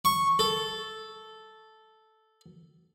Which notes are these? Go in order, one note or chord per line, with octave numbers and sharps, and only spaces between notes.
C#6
A4